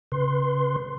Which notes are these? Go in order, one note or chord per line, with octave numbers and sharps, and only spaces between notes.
C#3 B4 C6